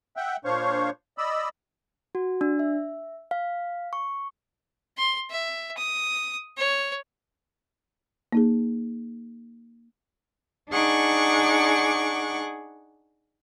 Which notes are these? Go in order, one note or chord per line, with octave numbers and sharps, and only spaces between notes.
E5 F#5 G5
A#2 D4 C5 C#5 F5 C#6
D5 D#5 B5 E6
F#4
D4
E5
F5
C#6
C6
E5
D#6
C#5
A#3 D#4 G#4
D4 D#4 G#4 F#5 C#6 D6